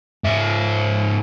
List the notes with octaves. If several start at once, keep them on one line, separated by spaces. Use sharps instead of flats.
G#2 E5